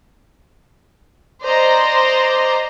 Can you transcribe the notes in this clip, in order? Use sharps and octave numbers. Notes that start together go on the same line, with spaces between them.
C5 D5 D#5 A#5 C6